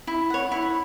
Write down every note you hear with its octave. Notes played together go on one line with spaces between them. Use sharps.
E4
C#5 F#5
E4